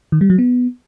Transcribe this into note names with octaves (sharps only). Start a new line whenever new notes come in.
D#3
G3
F#3
B3